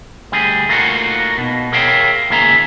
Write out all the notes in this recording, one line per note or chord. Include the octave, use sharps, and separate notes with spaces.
D2 G3 G#4
A3 A#3 D4 D#4 F4 F#4
B2
G#4 A#4 C#5 E5 F5 G5
C#2 D#3 A#3 G#4 E5 A#5